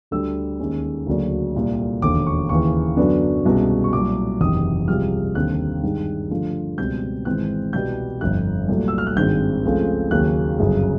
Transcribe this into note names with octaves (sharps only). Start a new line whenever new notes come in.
D2 D3 G3 E6
D#2 D#3 G#3 C#4
D2 C#3 F#3 A#3 D4
C2 A#2 G3
E1 D#2 D3 D6
C#6
D#2 C#3 E3 C#6
F#2 D3 F#3 B3 D4
C2 B2 G#3 C#4
C#6
C2 A#2 F#3 D6
F#1 E2 C3 D#3 D#6
C2 C3 F3 G#3 F6
D#2 D3 G3 C4 F#6
G2 D#3 G#3
G2 D3 F3 A3
C#2 B2 G3 C4 G6
G#1 G#2 E3 G#3 C4 F#6
C2 B2 G3 B3 G6
G1 F2 D3 F#6
C2 A#2 F#3 A3
E6
F6
F#6
G#1 G2 D#3 G#3 C4 G6
C#2 C#3 F3 A3 C4
D#2 C#3 F#3 A#3 C#4 F#6
G1 F#2 C#3